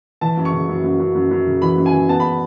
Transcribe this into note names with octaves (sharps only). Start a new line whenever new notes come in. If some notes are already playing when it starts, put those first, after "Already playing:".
E3 A5
F#2
C#6
C#3
F#2
F#2
F#2
F#2
F#2
C#3
E3 B5
F#2
G#5
E3
B3 A5
B5